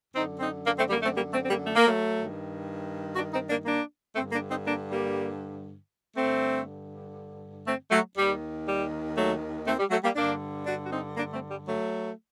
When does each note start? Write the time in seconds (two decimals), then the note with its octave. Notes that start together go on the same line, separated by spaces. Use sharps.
0.14 F#2 D3 C4 D#4
0.39 C4 D#4
0.64 A#3 D4
0.77 A3 C4
0.89 G3 A#3
1.02 A3 C4
1.15 G3 A#3
1.31 A3 C4
1.43 C4
1.48 G3 A#3
1.65 A3
1.75 A#3
1.85 F#3 A3
2.15 G2 D#3
3.15 D4 F#4
3.31 C4 D#4
3.48 A#3 D4
3.64 A#3 D4
4.14 G2 D3 A3 C4
4.32 A#3 D4
4.49 C4 D#4
4.65 A#3 D4
4.90 G3 A#3
6.15 G2 D3 A3 C4
7.66 A3 C4
7.90 F#3 A3
8.15 D#2 D#3 G3
8.65 G3
9.15 F#3 A3
9.66 A3 C4
9.78 G3
9.90 F#3 A3
10.03 G3 A#3
10.15 G2 D3 A#3 D4
10.66 D4 F#4
10.84 F#4
10.91 C4 D#4
11.16 A#3 D4
11.33 A3 C4
11.49 G3
11.65 F#3 A3